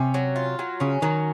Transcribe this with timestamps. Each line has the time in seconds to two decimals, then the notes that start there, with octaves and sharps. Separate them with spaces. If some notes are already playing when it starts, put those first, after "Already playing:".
Already playing: C3 C#4
0.14 F#3
0.36 F4
0.59 F#3
0.80 C#3 C#4
1.02 D#3 F#3